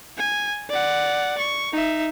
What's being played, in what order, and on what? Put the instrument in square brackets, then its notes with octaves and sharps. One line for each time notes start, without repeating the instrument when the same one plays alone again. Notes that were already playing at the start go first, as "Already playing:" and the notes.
[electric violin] G#5
D5 F#5
C#6
D#4 E5